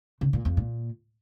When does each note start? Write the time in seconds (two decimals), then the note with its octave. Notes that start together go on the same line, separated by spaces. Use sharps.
0.21 C#3
0.33 A#2
0.45 F2
0.57 A#2